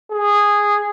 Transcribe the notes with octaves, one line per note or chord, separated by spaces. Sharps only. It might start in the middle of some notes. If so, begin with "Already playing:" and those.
G#4